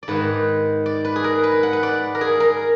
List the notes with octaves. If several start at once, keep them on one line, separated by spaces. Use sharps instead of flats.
D5
G#2 D#3 B4
D5
B4
G#4
A#4
B4
F#5
B4
D5
A#4
G#4
A#4